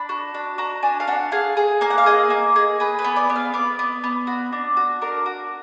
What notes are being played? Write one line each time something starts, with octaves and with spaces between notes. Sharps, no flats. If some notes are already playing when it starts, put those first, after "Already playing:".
Already playing: D4 B5
F#4
D4
F#4 A#5
D4 G#5
F5
D4 F#5
G#4 F5
G#4
A#3 G#5
F#5
F5
G#4 D#5
A#3
G#4
G#4 B4
B4
B3
D5
B3
F5
B3 D5
B3
B3
F#4
D4
F#4
D4 A#4
F#4